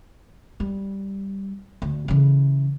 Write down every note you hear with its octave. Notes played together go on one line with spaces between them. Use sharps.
G3
D2
C#3 E3